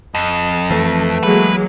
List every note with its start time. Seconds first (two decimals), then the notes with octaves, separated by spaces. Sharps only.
0.15 F2 D#5
0.70 E3 A3
1.23 F#3 G#3 A#3 B4